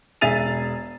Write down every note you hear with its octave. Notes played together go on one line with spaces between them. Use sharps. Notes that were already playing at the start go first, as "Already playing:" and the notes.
E1 G#4 E5 A6 D#7 F7